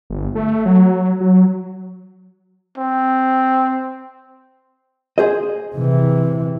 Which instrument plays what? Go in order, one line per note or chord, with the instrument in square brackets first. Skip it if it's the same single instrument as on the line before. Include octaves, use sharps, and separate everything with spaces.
[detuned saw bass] G1
A3
F#3
F#3
[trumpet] C4
[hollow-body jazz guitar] G#4 C5 D#5
[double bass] C3 E3